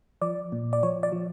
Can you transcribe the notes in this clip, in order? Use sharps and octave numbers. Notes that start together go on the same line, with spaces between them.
F3 D5
A#2
D5
F3 C#5
D5
F3